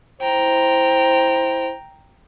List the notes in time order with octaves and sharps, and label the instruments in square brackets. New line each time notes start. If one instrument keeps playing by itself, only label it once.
[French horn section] E4 C5 [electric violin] G5 A#5